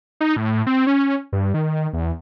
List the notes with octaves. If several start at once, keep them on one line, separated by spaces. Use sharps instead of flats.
D#4
A2
C4
C#4
G2
D#3
E2